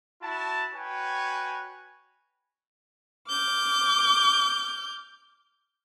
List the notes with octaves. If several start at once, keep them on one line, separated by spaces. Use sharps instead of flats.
E4 F#4 A5
F#4 B4 C#5 G5 G#5
D6 F6 G6